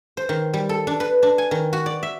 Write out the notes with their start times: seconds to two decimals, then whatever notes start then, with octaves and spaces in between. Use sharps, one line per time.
0.17 C5
0.29 D#3
0.54 G3
0.69 A4
0.87 D4
1.00 B4
1.22 D4
1.38 G#5
1.51 D#3
1.73 F#4
1.86 D5
2.03 E5